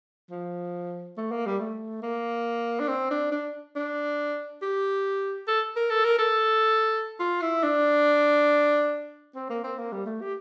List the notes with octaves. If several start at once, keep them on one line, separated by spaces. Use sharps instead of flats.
F3
A3
A#3
G3
A3
A#3
D4
C4
D4
D4
D4
G4
A4
A#4
A4
A#4
A4
F4
E4
D4
C4
A#3
C4
A#3
G3
A3
G4